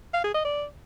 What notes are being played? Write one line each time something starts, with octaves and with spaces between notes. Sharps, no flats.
F5
G#4
D#5
D5